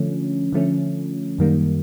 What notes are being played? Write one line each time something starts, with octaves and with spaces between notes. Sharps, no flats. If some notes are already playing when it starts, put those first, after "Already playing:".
Already playing: D3 F3 A3 C#4
D3 F3 A3 C#4
F#2 D#3 G3 A#3